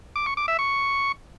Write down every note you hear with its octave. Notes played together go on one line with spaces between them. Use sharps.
D6
C#6
D6
E5
C#6